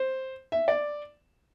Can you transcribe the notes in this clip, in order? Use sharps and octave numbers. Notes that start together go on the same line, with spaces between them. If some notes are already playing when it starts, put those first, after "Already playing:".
Already playing: C5
E5
D5